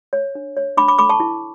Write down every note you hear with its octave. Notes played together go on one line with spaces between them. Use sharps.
C#5
D4
C#5
D4 B5 D6
B5 D6
A4 B5 D6
A5 C#6
E4